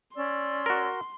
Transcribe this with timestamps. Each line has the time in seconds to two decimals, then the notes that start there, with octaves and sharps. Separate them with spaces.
0.15 C#4 D5 C6 E6
0.66 F#4 A#4